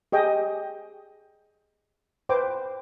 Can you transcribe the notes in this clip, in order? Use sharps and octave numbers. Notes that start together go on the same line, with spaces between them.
G4 G#4 D#5 G5
B4 C5 G5 D6